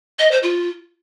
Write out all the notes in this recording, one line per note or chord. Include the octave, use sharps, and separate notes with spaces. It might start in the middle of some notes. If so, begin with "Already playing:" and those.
D#5
C5
F4